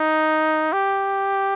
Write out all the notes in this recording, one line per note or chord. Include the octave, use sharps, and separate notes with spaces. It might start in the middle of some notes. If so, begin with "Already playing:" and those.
Already playing: D#4
G4